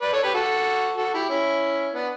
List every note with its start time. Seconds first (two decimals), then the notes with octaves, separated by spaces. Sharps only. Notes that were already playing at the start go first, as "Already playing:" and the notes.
0.02 B4 D5
0.13 A4 C#5
0.23 G4 B4
0.34 F#4 A4
0.98 F#4 A4
1.14 E4 G4
1.30 C#4 E4
1.94 B3 D4